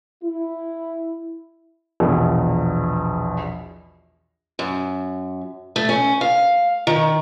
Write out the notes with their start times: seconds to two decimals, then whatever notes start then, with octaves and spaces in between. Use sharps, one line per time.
0.22 E4
2.00 A#1 E2 B2
4.59 F#2
5.76 A3
5.89 C#4
6.21 F5
6.87 D#3